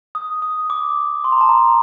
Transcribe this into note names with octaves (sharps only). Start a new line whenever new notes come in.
D#6
D#6
D6
C6
A#5
A5
A#5